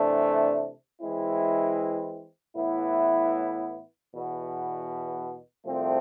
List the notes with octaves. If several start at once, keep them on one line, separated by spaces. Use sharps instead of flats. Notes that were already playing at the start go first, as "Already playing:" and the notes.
Already playing: C3 E3 A3 D4
E3 G#3 C4 E4
A2 E3 B3 E4
E2 B2 B3
C2 C3 F3 A3 C4